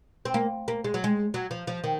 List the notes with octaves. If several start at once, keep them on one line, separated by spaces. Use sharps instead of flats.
C4
A#3
A#3
G#3
F#3
G#3
F#3
F3
F3
D#3